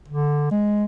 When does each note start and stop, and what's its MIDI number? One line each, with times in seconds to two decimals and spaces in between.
0.08 0.51 50
0.51 0.84 56